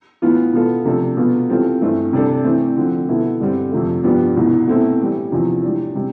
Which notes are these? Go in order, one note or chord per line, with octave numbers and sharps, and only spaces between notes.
A2 E3 B3 F4
B2 B3 F4 A4
C3 F3 A3 D4 A4
B2 B3 F4 A4
E3 G3 C4 F4 A4
G2 E3 A3 C4
C3 G3 D4 A4
E3 A3 C4
D3 F3 C4
B2 B3 E4 A4
G2 D3 G3 C4
F2 C3 F3 A3
G2 F3 B3 D4 G4
C2 B2 B3
B2 A3 C4 E4 A4
A2 E3 G3
E2 C3 F3
A2 G3 D4
C3 G3